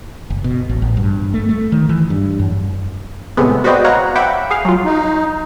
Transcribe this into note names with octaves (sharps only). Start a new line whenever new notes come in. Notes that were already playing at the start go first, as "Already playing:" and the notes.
F#1
B2
A1
A1
G2
A3
A3
D#3
E3
G2
F#2
A2 C3 G#3 B3
F#4 B4 C5 D5 D#5 G5
C#5 F5 F#5 A#5
E5 F#5 G5 B5 D6
G#4 F5
F#3 F4
D#4